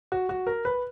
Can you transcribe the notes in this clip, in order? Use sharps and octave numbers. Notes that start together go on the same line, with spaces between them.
F#4
F#4
A#4
B4